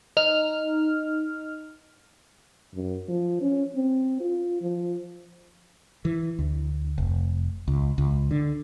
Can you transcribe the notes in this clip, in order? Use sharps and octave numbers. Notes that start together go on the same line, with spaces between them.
D#4 F6
F#2
F3
C#4
C4
F4
F3
E3
D2
F1
C#2
C#2
D3